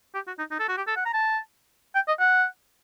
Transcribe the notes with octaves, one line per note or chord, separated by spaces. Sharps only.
G4
F#4
D#4
D#4
A4
F#4
G4
A4
F#5
A#5
A5
G5
D#5
F#5